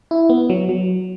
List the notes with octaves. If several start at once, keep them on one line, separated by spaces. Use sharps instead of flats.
E4
B3
F#3
F#3